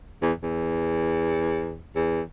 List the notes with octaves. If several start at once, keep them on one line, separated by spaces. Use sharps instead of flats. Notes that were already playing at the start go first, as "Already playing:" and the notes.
E2
E2
E2